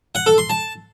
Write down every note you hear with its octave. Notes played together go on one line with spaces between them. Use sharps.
F#5
A4
C6
A5